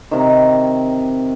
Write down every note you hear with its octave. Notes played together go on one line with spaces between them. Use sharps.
C3 D#3